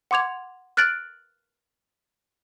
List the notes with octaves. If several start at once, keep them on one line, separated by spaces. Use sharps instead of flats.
F#5 C6 D6 G#6 F7
F6 F#6 A6 D7 F#7